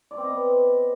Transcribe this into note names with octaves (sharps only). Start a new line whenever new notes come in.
D5
C4
D#5
B3